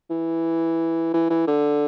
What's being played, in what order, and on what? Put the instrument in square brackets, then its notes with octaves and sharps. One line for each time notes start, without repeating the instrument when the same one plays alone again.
[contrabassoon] E3
E3
E3
D3